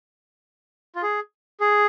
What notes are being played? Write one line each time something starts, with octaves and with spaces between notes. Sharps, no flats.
F4
G#4
G#4